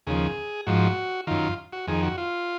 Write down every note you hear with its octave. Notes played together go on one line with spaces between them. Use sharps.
D#2 C#3 F3 G#4
G#2 F3 F#4
F#2 D#3 F4
F#4
F2 D#3 G#4
F#4
F4